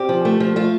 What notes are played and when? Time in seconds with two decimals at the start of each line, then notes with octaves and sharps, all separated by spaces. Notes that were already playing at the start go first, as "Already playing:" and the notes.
Already playing: C4 G4
0.09 F3
0.25 A3
0.40 F3
0.56 A3 F4